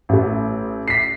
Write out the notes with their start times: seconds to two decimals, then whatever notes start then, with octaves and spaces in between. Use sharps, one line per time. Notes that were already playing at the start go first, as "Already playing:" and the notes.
0.09 A1 A3
0.88 B6 C7